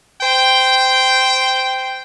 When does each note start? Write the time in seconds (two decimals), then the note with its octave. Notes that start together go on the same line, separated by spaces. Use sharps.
0.21 C5 G5